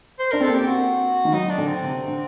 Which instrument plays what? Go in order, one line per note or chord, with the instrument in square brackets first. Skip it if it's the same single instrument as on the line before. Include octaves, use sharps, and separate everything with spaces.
[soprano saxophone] C5
[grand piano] D4 [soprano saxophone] A#4
[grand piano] C4 [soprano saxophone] A4
[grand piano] A#3
[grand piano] C4 [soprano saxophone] G4
[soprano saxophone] F#4
[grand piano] D#3
[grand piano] F#3 [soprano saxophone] D#4
[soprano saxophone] D4
[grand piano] D3
[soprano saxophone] C4
[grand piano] C3
D3